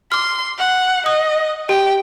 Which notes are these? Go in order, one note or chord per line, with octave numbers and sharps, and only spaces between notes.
C6 D6 F6
F#5
D#5 D#6
G4 G5